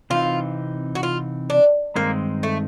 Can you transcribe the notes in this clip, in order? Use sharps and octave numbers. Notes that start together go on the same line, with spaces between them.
C3 E3 A3 C4 D#4 F4
F#4
F4
D4
G2 D#3 G#3 A#3 C4 D#4
A3